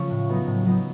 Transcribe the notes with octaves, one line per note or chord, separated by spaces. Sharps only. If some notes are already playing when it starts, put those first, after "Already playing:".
Already playing: C#3 F3 A3 C#4 C#6
A2
F#3 B3 D#4
A2
F#3 B3 D#4